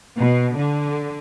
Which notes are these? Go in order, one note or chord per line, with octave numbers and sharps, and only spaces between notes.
B2
D3